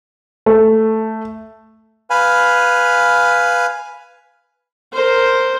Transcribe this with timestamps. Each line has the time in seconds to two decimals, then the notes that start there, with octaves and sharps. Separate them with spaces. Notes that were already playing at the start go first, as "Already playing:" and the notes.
0.46 A3
2.10 B4 F5 G#5 B5
4.93 A#4 C5